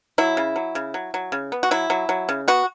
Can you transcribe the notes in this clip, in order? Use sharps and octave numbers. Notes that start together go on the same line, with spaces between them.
F#3 E4
C#3
F#3
C#3
F#3
F#3
C#3
B3
F#4
F#3 E4
F#3
F#3
C#3
B3 F#4